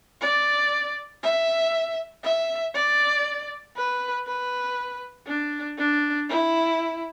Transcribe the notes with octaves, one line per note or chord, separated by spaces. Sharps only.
D5
E5
E5
D5
B4
B4
D4
D4
E4